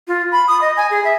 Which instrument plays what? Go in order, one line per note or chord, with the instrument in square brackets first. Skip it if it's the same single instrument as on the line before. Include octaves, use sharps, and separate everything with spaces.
[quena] F4
B5
D#6
D#5
G#5
G#4
E5